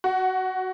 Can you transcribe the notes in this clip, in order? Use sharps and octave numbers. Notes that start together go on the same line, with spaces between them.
F#4